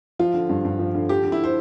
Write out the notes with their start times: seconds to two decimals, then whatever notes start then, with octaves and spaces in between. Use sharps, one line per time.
0.19 F3 F4
0.34 D3
0.49 G2
0.65 G2
0.79 F3
0.95 D3
1.09 F3 G4
1.24 D3
1.32 E4
1.44 C5